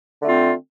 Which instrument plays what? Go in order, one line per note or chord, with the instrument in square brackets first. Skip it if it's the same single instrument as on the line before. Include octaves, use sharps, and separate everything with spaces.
[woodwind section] D3 A3 C4 F4